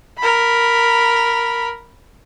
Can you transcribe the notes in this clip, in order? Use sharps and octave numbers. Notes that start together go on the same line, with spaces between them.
A#4 B5